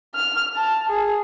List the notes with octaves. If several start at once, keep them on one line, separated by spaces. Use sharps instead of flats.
F6
A5
G#4